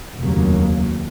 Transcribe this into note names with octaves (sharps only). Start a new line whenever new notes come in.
F1 D#2 C#3 F#3 A#3